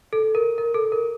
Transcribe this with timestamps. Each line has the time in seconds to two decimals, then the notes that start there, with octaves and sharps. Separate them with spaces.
0.13 A4
0.35 A#4
0.58 A#4
0.74 A4
0.92 A#4